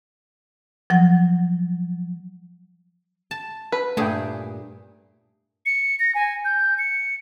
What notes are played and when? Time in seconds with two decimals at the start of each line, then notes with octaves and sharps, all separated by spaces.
0.90 F3 F#3 F#5
3.31 A5
3.72 B4
3.97 G2 A#2 A3 G#4 G5
5.66 C#7
5.99 A#6
6.15 G#5
6.45 G6
6.78 C#7